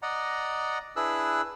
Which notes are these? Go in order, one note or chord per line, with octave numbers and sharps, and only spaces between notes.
D5 D#5 F#5 A#5
D4 E4 G#4 B4 E6 F#6